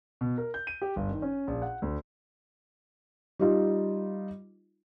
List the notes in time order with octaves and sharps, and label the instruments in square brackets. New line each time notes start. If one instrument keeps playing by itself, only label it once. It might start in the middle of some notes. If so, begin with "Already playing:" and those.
[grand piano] B2
A#4
G6
D#7
G4
G1
D#3
C#4
A#1
F#5
D2
[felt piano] G3 D#4 F4